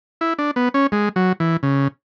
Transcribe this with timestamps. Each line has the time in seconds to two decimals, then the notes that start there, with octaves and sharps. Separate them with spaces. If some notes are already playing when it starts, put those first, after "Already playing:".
0.21 E4
0.39 D4
0.56 B3
0.74 C#4
0.92 G#3
1.16 F#3
1.40 E3
1.63 C#3